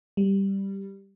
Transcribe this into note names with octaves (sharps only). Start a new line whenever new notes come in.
G3